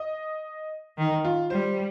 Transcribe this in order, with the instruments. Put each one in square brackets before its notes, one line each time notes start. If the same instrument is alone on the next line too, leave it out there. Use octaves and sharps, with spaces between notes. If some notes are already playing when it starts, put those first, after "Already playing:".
Already playing: [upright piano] D#5
[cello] D#3
[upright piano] F4
[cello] G3 [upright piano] C5